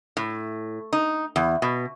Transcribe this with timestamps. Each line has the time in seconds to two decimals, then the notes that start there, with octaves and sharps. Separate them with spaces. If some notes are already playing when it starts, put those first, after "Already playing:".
0.17 A2
0.93 D#4
1.36 E2
1.62 B2